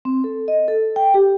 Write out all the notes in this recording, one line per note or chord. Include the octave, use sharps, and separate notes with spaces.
C4
A4
D#5
A4
G5
G4